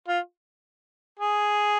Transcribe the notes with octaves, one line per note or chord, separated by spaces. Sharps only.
F4
G#4